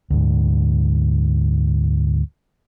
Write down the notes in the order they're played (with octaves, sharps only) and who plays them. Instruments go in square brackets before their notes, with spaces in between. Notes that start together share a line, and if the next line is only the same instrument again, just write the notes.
[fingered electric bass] D2 G#2